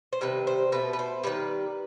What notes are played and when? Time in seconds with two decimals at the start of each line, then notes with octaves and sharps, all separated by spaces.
0.13 C5
0.21 C3 D#3 G3 B4
0.47 C5
0.72 B2 A3 B4
0.93 B4
0.99 C5
1.23 D#3 G3 B4